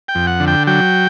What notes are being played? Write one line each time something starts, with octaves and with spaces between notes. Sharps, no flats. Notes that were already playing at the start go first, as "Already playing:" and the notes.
G5
F2
F#5
D3
G5
F#3 G5